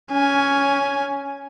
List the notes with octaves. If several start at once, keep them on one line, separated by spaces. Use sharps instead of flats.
C#4 G#5